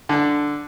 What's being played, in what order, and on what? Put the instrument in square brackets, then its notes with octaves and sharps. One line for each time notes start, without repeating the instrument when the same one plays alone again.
[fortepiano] D3